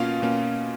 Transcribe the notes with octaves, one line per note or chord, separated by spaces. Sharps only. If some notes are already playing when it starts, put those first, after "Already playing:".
Already playing: B2 A#3 C#4 F4 F5
B2 A#3 C#4